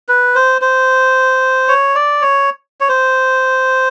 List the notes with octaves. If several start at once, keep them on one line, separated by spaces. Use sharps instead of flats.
B4
C5
C5
C#5
D5
C#5
C#5
C5